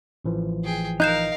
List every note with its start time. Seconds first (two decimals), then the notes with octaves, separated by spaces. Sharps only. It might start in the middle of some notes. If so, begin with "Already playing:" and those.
0.25 A1 E3 F3
0.64 G#4 G5
1.00 D#4 A#4 F5 F#6 G6 E7